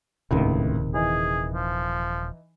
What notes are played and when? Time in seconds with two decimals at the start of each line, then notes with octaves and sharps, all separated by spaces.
0.31 D#1 C#2 A2 C3 D#3
0.94 E3 D#4 G#4
1.54 F3